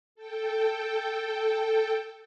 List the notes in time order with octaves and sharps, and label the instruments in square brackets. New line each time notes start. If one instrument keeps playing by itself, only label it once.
[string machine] A4 G5